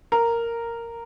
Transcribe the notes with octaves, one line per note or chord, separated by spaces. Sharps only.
A#4